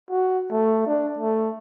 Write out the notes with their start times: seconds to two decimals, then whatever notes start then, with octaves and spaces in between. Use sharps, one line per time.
0.10 F#4
0.51 A3
0.87 D4
1.19 A3